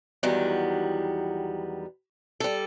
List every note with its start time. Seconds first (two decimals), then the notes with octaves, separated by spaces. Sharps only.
0.23 E2 D#3 F#3 G3 B3
2.40 G3 A4